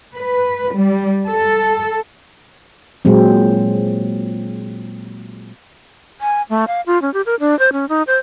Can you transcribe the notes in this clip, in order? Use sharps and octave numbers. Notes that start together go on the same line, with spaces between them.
B4
G3
A4
A#2 F#3 G#3 C4
G#5
A3
F5
F4
C#4
G4
A#4
D4
C5
C#4
D#4
C5